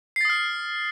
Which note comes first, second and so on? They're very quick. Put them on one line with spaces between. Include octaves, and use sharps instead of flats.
C7 A6 D#6 F6